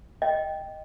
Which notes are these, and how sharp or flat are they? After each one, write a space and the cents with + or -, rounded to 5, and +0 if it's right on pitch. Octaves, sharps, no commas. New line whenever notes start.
D#5 +0 G5 +0